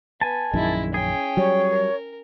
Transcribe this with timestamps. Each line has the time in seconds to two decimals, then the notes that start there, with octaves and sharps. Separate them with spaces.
0.21 B3 G#5 A5
0.53 A#1 F#2 D#3 G#3 E4
0.94 C#4 G#4 G5
1.37 F#3 G3 C#5
1.71 A#4